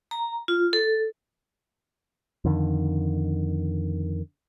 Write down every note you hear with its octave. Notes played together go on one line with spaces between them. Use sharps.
A#5
F4
A4
F2 D3 D#3